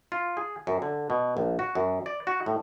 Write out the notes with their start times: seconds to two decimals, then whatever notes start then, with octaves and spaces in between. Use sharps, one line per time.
0.12 F4
0.37 G#4
0.67 F#2
0.82 D3
1.10 B2
1.37 A#1
1.59 F#4
1.75 F#2
2.06 D5
2.27 F#4
2.46 A2